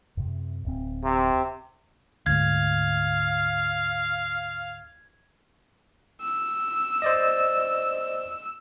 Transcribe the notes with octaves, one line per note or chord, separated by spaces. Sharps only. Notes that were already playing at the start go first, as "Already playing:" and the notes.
F#2 C3
D1 C4
C3
D2 G#2 F5 G#6
E6
C5 D5 D#5